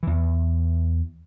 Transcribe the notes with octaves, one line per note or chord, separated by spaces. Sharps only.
E2 E3